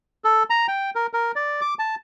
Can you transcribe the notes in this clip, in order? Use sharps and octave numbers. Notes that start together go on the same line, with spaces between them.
A4
A#5
G5
A#4
A#4
D5
D6
A5